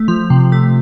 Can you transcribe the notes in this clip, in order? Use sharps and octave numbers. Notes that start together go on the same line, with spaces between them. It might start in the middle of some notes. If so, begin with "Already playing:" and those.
Already playing: A3
F3
C3
A3